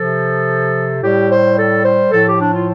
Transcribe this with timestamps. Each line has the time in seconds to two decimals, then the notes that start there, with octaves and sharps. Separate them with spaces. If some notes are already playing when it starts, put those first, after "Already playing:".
Already playing: C3 F3 A4
1.01 A2 G3 G4
1.29 C5
1.56 A4
1.83 C5
2.11 A2 F3 A4
2.24 G4
2.38 D4
2.52 F4